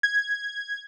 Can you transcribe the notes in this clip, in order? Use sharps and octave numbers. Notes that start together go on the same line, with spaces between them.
G#6